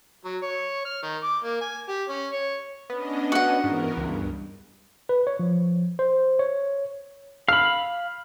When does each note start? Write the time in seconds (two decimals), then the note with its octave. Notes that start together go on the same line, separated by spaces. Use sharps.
0.25 F#3
0.43 C#5
0.85 F6
1.03 D#3
1.24 D6
1.44 A#3
1.61 G#5
1.89 G4
2.09 C#4
2.33 C#5
2.90 B3 C#4 D4 D#5
3.32 F#4 F#5
3.64 G#2 E3 B3 A#4
3.97 C#2 G2
5.09 B4
5.27 C#5
5.39 F3
5.99 C5
6.39 C#5
7.48 F5 B5 F6